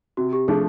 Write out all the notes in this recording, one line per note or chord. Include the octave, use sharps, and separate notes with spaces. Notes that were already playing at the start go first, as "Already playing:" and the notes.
C3 F#4
G4
F3 A3 D4 F4 G#4